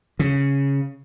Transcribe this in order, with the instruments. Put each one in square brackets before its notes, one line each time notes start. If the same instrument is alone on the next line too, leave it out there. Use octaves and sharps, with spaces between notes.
[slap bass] C#3